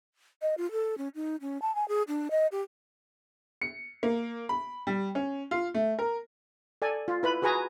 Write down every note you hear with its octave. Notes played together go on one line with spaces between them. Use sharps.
D#5
F4
A4
C#4
D#4
C#4
A5
G#5
G#4
D4
D#5
G4
C#7
A#3
B5
G3
C#4
F4
A3
A#4
A4 D5 G#5
F4
E4 B4 B5
F#4 G#4 B4 G#5 A#5